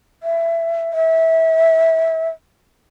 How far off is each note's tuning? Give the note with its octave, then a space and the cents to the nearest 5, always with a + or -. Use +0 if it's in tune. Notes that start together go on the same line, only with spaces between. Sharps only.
E5 +20
E5 -20